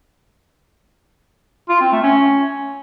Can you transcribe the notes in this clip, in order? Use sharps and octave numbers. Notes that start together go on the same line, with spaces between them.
F4
C4
A3
C#4